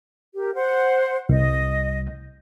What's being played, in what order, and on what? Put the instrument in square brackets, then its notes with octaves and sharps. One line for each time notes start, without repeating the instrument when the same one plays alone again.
[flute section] G4 A#4
C5 F#5
[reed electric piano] C2 [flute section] D#5